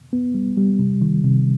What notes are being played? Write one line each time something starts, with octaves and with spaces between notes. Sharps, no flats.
B3
G3
G3
C3
D#3
C3